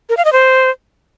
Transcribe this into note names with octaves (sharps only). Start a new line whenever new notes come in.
A#4
F5
D#5
C5